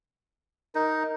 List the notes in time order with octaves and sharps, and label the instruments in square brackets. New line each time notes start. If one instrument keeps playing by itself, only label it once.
[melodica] D#4 [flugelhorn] A#4